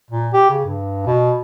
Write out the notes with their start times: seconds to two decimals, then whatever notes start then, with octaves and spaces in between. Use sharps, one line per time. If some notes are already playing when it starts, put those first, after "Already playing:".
0.11 A#2
0.33 G4
0.50 C#3
0.65 G2
1.06 B2